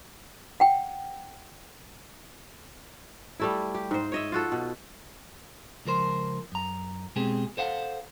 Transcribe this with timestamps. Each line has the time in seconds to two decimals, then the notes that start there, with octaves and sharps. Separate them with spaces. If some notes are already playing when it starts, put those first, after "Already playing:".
0.60 F#5 G5
3.40 G3 A3 E4
3.75 G4
3.91 G#2 C5
4.12 C#5 D#5 E5
4.32 F4 F#4 A4
4.52 B2
5.85 C#2 F3 A#4 C5
6.52 F#2 A#5
7.16 B2 G#3 C4 G4 G#4
7.57 A4 C5 F5 F#5